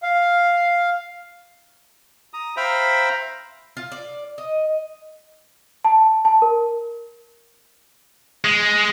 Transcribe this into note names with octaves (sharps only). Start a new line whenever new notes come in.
F5
A#5 D#6
C5 E5 F5 G5 A#5 B5
F4
D5
D#5
A5
A5
A#4
G#3